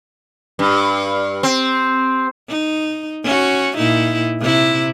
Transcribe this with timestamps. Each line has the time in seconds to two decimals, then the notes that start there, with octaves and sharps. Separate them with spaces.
0.59 G2
1.43 C4
2.49 D#4
3.24 C#4 F#4
3.76 A#2 D#4 E4
4.40 C3 E4